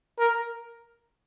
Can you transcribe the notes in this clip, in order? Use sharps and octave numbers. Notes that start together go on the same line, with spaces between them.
A#4